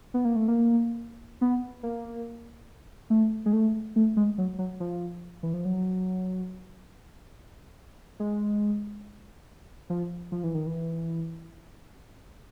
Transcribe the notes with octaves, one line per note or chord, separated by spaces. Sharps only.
B3
A#3
A3
A#3
B3
A#3
A3
G#3
A3
A3
G#3
F#3
F#3
F3
E3
F3
F#3
G#3
F3
F3
E3
D#3
E3